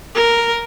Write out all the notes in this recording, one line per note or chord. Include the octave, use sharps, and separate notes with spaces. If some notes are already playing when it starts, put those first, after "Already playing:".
A#4